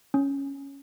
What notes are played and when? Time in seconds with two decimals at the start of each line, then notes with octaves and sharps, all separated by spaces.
0.14 C#4